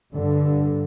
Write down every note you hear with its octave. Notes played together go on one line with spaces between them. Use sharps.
G2 D3